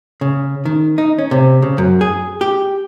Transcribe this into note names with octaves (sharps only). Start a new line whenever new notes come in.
C#3
D#3
D#4
C#4
C3
C#3
F#2
G#4
G4